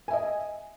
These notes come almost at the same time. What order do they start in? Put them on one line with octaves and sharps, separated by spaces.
G#5 E5 D#5